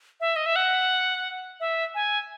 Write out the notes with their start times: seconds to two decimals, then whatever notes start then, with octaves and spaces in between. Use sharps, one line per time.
0.20 E5
0.36 D#5
0.46 E5
0.56 F#5
1.60 E5
1.95 G#5